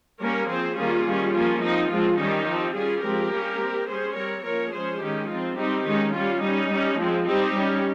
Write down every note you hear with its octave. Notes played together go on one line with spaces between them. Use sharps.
G3 A#3 C#4 A#4 C#5
F3 C4 G#4 C5
D#3 G3 A#3 C#4 F4 G#4
D#3 G3 C#4
F3 A#3 C#4 F4
F3 C4 D#4
F3 G#3 C4 F4
D#3 G3 C#4 D#4 G4
F3 C4
G3 C#4 F4 G#4
F3 G#3 C4 G4 A#4
G3 A#3 C#4
G3 C4
G3 C#4 G#4 C5
G3 C4 A#4 C#5
F3 A#3 C#4 A#4 C#5
F3 G#3 C#4 G#4 C5
D#3 G#3 C#4 D#4 G4
F3 C4 F4
G3 C4 D#4 G4
D#3 G#3 C#4 D#4
G3 C#4 F4
G3 C#4 D#4
G3 C#4
F3 G#3 C4
G3 C4 D#4 G4
G3 C#4